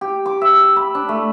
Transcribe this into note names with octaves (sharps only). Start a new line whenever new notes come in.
G4
D6
E5
B5
D4
A3